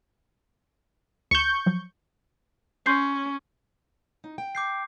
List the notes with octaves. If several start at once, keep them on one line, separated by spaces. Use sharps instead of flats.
D2 C#6 G6 E7
F3 F#3
C#4 C6 G6 C7
D#4
G5
D6 G6 C7